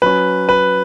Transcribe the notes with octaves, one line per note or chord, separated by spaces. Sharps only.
F#3 C#4 B4
B4